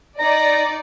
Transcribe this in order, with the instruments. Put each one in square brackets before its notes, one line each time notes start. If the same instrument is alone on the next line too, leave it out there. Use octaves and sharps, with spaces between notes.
[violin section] D#4 D5 [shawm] A#5